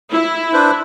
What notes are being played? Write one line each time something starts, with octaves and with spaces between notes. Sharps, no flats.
E4
D4 B4 C5